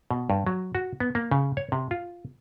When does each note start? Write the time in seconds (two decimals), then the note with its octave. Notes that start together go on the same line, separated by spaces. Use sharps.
0.11 B2
0.30 G2
0.47 F#3
0.75 F#4
1.00 B3
1.15 A#3
1.31 C#3
1.57 C#5
1.72 C3
1.91 F4